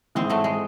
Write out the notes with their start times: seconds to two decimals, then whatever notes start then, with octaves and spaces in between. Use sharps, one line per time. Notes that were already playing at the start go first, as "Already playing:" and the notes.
0.15 G#1 G#2 E3 G#3 C4
0.30 F#3 A3
0.44 G#3